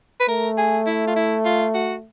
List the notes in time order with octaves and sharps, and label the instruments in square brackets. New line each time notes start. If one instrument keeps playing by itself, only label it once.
[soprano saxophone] B4
[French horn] A3 [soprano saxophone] A#4
[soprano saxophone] G#4
E4
F4
E4
F4
F#4